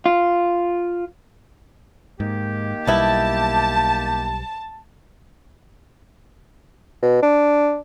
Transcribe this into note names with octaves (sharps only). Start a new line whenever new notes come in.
F4
G#2 D#3 A#3 G4
B1 G3 B3 E4 A5
B2
D4